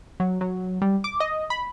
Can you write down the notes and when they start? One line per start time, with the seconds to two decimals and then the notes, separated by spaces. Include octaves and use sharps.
0.20 F#3
0.41 F#3
0.82 G3
1.04 D6
1.20 D#5
1.50 B5